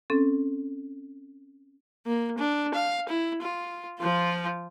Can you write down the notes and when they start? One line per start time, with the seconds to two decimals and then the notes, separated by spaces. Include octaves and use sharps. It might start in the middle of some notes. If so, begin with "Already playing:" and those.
0.10 C4 C#4 A4
2.06 A#3
2.38 D4
2.74 F5
3.09 E4
3.41 F4
3.99 F3 F4